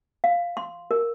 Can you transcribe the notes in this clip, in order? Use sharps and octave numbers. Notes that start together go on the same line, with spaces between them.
F5
C6
A#4